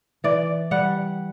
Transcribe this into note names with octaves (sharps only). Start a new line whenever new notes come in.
E3 D5
G3 F#5